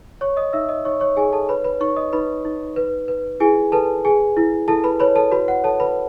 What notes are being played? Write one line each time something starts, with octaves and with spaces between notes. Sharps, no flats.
C#5 C#6
D#5 D#6
D#4 E5 E6
D#5 D#6
D#4 C#5 C#6
C#5 C#6
D#4 G#4 G#5
A4 A5
B4 C#5 B5
B4 B5
D#4 C#5 C#6
D#5 D#6
D#4 B4 B5
D#4
B4
B4
E4 G#4 G#5
A4 B4 A5
G#4 G#5
E4
E4 A4 A5
B4 B5
B4 C#5 B5
A4 A5
F#4 B4 B5
F#5
A4 C#5 A5
B4 B5